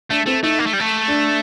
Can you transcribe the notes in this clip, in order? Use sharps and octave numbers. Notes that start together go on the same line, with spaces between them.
A3 D4
A3 C4
A3 D#4
A#3
A3
G3
A3
D4